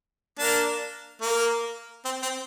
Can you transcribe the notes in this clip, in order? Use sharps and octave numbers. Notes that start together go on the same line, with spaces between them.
A#3 D4
A#3
C4
C4